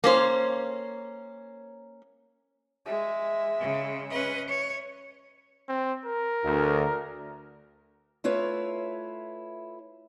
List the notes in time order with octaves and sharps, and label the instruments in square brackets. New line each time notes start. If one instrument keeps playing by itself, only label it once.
[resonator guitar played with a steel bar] A#3 C#4 C5
[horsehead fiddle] G#3 E5
[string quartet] C#3
C#4 B4 D#5
C#5
[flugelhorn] C4
A#4
[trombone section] D2
[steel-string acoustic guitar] A3 E4 F4 B4 C#5